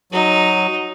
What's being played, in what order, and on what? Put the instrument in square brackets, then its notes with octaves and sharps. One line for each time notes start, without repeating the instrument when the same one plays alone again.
[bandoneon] F#3 [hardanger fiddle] D#4